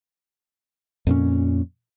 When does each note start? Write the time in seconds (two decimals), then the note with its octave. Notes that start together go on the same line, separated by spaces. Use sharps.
1.07 F2 A#2 C#4